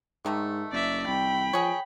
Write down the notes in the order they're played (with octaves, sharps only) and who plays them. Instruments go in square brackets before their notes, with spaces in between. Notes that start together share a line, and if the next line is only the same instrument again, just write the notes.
[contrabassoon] G#2 [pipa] D3 D#3 A3
[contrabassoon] F#1 [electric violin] D5 E5
[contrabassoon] C2 [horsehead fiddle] G5 [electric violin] B5
[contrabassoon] F3 [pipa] G#4 C#5